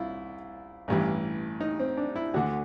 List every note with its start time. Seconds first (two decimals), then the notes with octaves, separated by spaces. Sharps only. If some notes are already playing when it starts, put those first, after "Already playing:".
Already playing: C2 E4 F4
0.88 A1 G2 E3
1.61 D#4
1.79 C4
1.97 D4
2.16 E4
2.34 D2 D3 F#4